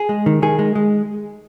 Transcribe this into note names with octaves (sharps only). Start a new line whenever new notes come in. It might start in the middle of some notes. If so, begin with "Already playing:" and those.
Already playing: G#4
G#3
D#3
D#3 G#4
G#3
G#3